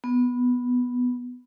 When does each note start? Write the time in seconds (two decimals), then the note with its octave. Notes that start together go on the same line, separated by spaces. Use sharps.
0.04 B3